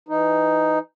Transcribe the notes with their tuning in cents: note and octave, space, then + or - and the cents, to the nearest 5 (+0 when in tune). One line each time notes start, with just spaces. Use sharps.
E3 +15 D#4 +0